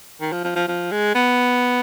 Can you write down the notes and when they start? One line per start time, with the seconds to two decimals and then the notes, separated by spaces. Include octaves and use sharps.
0.21 D#3
0.32 F3
0.44 F3
0.56 F3
0.68 F3
0.91 G#3
1.15 B3